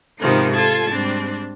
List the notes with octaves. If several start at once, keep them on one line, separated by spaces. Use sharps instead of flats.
G#2 C3 D#3 F3 B3 D#4
F4 A4 A5 G#6
G#2 G3 C4 D4